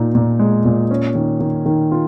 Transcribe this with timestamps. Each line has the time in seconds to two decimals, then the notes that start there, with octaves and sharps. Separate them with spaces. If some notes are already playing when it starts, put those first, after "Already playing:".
Already playing: A#2 D#4
0.15 A#2
0.39 G#3
0.65 A#2
0.91 C#4
1.15 D#3
1.40 D#3
1.66 D#3
1.92 F4